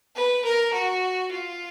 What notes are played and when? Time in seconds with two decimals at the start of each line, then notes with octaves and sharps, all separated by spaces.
0.15 B4
0.44 A#4
0.73 F#4
1.31 F4